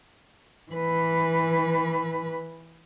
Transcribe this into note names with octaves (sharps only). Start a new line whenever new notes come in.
E3 B4